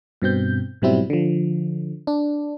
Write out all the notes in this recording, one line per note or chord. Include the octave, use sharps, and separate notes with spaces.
G2 B2 C4 G6
G#2 B2 F#3 G3 C4 E4
D3 F3
D4